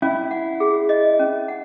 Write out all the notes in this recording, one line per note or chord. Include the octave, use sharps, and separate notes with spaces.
C#4 E4
F#5
G#4
D#5
C#4
F#5